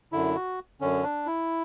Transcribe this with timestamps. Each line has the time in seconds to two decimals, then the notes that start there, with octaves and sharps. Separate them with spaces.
0.12 F#2 D3 E4
0.36 F#4
0.81 F#2 D3 C#4
1.03 D4
1.26 E4